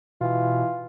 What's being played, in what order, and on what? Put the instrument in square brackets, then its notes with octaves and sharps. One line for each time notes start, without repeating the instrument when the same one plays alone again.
[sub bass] B2 [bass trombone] E3 [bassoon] F4